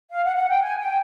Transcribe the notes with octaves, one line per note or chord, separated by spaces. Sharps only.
F5
F#5
F#5
G5
G#5
G5